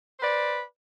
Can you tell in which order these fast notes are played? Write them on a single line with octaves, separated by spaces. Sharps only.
C5 B4 D5